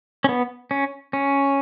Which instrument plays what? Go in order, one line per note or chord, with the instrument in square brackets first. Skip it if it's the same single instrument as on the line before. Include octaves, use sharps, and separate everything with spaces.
[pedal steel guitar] C#4
B3
C#4
C#4